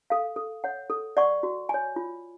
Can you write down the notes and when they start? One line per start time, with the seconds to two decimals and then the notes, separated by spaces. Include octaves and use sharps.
0.10 A4 F5
0.36 A4
0.64 C#5 F#5
0.90 A4
1.17 D5 F#5 C#6
1.43 F#4
1.69 C#5 G#5
1.96 F4